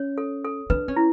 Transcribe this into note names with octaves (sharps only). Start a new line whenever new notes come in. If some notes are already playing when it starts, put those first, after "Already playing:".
Already playing: C#4 C#5
A4
A4
D4 B4
C#4
E4